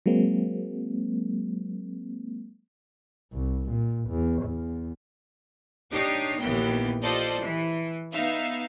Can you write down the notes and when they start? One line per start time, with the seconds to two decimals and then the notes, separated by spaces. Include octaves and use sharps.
0.06 F#3 G#3 A#3 C4
3.32 C2
3.70 A#2
4.10 E2
4.42 E2
5.91 D4 D#4 G4 C#5 D#6 C7
6.39 A#1 D#2 E3 B3 G5
7.02 F4 G4 A4 C5 D5 D#5
7.38 E3
8.11 B3 D#4 E5 F5